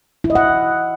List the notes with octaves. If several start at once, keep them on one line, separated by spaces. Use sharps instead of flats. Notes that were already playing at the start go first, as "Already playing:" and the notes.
E4
D#5
F#5